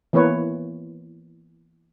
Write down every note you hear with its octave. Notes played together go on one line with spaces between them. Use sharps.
E3 A#3 B3 B4 C#5